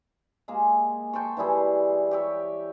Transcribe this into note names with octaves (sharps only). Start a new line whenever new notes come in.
G#3 A#3 G#4
G5 A5 C6 C#6
E3 G3 E4 G#4
G4 C#5 E5